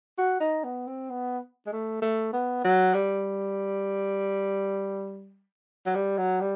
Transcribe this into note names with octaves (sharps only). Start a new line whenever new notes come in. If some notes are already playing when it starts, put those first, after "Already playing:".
F#4
D#4
B3
C4
B3
G#3
A3
A3
B3
F#3
G3
F#3
G3
F#3
G3